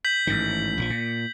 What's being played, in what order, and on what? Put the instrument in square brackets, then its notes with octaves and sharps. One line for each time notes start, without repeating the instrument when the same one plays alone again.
[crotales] G6 B6 F#7
[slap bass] A1 G#2 D#3
A#1 C#3 F3
A#2